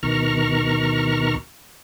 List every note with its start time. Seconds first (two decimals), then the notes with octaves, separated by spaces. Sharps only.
0.03 D2 B2 D#3 A#5 C#6 F6